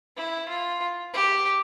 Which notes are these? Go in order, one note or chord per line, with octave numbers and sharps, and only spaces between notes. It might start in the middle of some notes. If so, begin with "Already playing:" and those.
E4
F4
G4